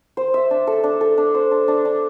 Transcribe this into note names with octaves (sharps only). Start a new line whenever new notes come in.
C5
E5
D4
A4
D4
A4
D4
C5
D4
D4
D4